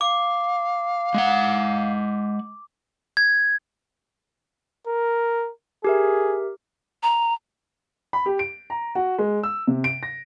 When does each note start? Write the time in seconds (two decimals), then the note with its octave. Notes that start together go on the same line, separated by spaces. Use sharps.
0.01 F5 D6
1.14 G#3 F#5
3.17 G#6
4.87 A#4
5.84 G4 G#4 A#4 E5
7.03 A#5
8.13 B5
8.26 G4
8.39 D7
8.70 A#5
8.95 F#4
9.19 G#3
9.43 E6
9.67 C3
9.84 D7
10.03 A#6